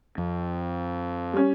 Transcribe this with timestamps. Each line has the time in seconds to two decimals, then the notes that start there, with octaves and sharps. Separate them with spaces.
0.18 F2
1.33 G3 C#4